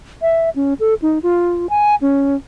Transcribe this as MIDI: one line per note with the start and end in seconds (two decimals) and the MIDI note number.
0.22 0.50 76
0.56 0.74 61
0.80 0.94 69
1.02 1.19 63
1.23 1.67 65
1.70 1.95 80
2.02 2.36 61